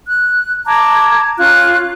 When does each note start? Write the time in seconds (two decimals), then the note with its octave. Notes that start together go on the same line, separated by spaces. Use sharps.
0.08 F#6
0.67 A5 A#5 D6 G#6
1.39 C#4 F4 F#6